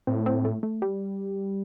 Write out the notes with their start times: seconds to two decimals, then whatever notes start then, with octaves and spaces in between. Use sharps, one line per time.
0.07 A2 C4
0.26 C4
0.45 A3
0.63 A3
0.82 G3